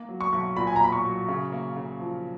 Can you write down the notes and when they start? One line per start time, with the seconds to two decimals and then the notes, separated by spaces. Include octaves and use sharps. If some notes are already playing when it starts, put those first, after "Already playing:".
Already playing: A#3
0.09 F#3
0.21 C#6
0.33 B1
0.56 A#2 B5
0.67 G#5
0.76 A#5
0.80 A#3 B5
0.92 C#6
1.04 F#3
1.28 C#3
1.52 A#3
1.76 C#3
2.00 F3